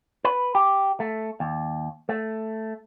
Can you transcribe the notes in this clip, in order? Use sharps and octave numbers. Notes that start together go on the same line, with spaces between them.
B4
G4
A3
D#2
A3